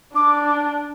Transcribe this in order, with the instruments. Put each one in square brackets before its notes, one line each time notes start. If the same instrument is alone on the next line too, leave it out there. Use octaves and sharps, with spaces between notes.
[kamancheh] D4 [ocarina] D6